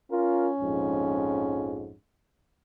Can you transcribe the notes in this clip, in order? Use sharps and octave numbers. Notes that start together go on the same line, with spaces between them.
C#4 F4 A#4
A#1 F2 G#2